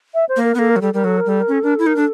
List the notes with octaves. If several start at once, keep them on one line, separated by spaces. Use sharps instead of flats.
E5
C5
A#3
A#4
B3
A#3 A4
A#4
F#3
G3 A4
G3 A#4
F#3 A4
A#4
G3 A4
A#4
C#4 A4
D4 A#4
E4 A4
D#4 A#4
D4 A4